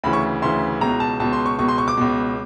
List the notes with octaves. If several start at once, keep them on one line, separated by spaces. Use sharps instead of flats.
D2 C#3 E3 B5
C#6
D2 C#3 E3 C6
C#2 B2 A#5
A5
C#2 B2 A5
C6
C#6
C#2 B2 C#6
C6
C#6
D6
C#2 B2